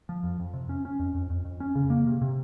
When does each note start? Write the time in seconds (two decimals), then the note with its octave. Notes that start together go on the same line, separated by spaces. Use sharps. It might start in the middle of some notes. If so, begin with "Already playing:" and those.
0.09 F3
0.23 F2
0.40 F2
0.54 C3
0.69 C#4
0.85 C#4
0.99 F2
1.15 F2
1.30 F2
1.45 F2
1.60 C#4
1.75 C#3
1.90 A#3
2.06 C3
2.22 C3